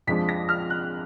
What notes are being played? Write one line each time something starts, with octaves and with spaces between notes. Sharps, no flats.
F2 F3 G#3 D4 B6
A#6
F6
F#6